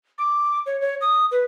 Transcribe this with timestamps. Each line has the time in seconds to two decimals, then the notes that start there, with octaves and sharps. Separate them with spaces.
0.18 D6
0.66 C#5
0.81 C#5
1.01 D#6
1.31 B4